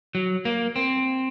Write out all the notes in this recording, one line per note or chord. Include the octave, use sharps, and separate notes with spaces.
F#3
A#3
C4